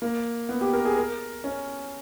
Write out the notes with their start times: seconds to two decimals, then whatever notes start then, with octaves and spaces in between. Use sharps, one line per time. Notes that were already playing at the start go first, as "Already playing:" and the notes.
0.02 A#3
0.49 B3
0.61 G4
0.73 A#4
0.85 G#4
0.96 A#4
1.44 C#4